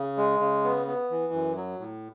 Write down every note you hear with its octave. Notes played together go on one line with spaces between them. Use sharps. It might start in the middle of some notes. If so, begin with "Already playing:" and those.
Already playing: C#3
G#3
C#3
B3
B3
E3
F#2
F#3
A2